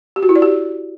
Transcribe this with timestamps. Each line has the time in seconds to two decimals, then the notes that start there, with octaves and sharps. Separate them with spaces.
0.16 G4
0.23 F#4
0.29 E4
0.36 D5
0.42 G4